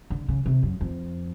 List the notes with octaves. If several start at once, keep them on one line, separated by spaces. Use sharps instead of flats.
D3
C#3
C3
F#2
F2